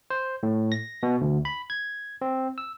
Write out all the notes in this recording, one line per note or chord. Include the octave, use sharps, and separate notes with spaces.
C5
A2
A#6
B2
D2
B5
G#6
C4
E6